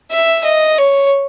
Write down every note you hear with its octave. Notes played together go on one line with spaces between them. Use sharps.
E5
D#5
C#5